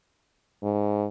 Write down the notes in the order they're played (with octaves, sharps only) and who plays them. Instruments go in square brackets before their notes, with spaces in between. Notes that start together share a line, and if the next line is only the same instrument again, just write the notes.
[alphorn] G#2